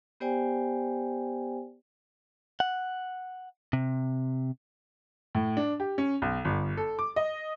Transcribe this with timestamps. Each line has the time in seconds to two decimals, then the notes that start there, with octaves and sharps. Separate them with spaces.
0.20 B3 G4 C5 D5 G5 G#5
2.60 F#5
3.73 C3
5.35 A2
5.57 D4
5.80 G4
5.98 C#4
6.22 B1
6.45 G1
6.77 A4
6.99 D6
7.16 D#5